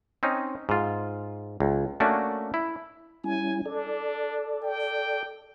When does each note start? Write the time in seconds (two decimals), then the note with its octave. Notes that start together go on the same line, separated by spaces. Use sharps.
0.23 C4 C#4 D#4
0.69 G#2 F4
1.60 C#2
2.00 A3 A#3 C#4 D4 F#4
2.54 E4
3.24 G3 C#4 E4 G#5
3.66 D4 A4 D5
4.63 G5